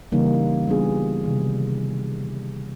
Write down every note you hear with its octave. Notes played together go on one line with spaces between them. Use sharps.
C#3 E3 G3 A#3 D#4
G3 B3 D4 F4 G#4
C3 D#3 G3